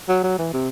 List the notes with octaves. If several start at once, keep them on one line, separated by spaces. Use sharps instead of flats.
F#3
F#3
E3
C3